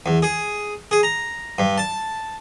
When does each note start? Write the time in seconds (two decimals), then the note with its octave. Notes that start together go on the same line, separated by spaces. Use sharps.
0.06 E2
0.23 G#4
0.91 G#4
1.03 A#5
1.58 G2
1.78 A5